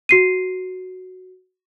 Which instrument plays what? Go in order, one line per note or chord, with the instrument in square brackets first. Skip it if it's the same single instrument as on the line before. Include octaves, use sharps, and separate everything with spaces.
[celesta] F#4 C7 D#7